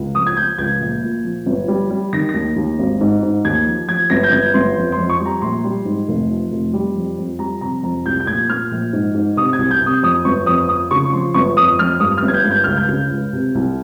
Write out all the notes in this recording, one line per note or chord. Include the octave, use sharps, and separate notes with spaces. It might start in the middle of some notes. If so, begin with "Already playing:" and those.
Already playing: C#2
F3 D#6
G#6
F3 G6
C#2 G#6
A#1
A#2
F3
G1
G3
G3
D#3 A#6
D#2 A#6
D#2
G#1
G#2
G#2
D#2 G#6
F3
F3 G#6
G1 A#6
G6
G1 G#6
G1 C6
F2
C6
F2
C#6
G3
A#5
A#1 C6
G3
G#2
F1
F3
F1
G3
F2
F2
G3 A#5
C3 A#5
F2 A#5
C2 G6
G6
A#2 G#6
A#2 F6
A#1
G#2
G#2
C3 D#6
G#6
C2
G6
C3
D#6
F2 D#6
G1 C#6
F2 D#6
F3 D#6
C#3 C#6
C#6
F3 C6
G1 C#6
F2 D#6
F2 F6
G2 D#6
F6
G1
G#6
G6
G2
G6
C#2 F6
G6
C#3
C#2
C3
C2